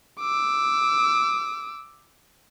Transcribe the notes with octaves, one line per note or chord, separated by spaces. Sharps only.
D6 E6